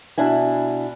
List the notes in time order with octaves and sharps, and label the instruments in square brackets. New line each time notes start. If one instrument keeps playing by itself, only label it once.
[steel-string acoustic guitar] B2 D4 E4 G#5